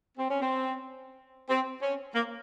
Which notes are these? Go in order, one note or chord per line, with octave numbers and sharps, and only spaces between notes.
C4
C#4
C4
C4
C#4
A#3